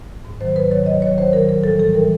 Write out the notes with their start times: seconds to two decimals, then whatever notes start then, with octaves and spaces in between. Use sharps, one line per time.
0.25 G#2
0.41 D#3 F#3 C5
0.56 G#2 B4
0.71 D#3 F#3 C#5
0.86 D#2 D#5
1.02 D#3 F#3 C#5
1.18 D#2 C5
1.33 D#3 F#3 A#4
1.49 A2 A#4
1.64 E3 G3 A4
1.79 A2 A4
1.94 E3 G3 A#4